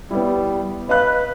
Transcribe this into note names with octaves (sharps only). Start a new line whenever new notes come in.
G3 B3 E4
B4 D#5 F5 F#6